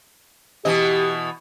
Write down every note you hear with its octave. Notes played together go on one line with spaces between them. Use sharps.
B2 E3 G4 D#5